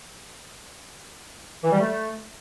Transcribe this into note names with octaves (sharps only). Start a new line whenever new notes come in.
E3
G3
A3